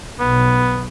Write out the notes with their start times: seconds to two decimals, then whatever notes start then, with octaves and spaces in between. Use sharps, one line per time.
0.20 B1 B3